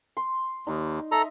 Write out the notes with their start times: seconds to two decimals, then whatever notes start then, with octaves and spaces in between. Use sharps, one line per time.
0.17 C6
0.67 D#2 D#4
1.12 A4 D#5 E5 A#5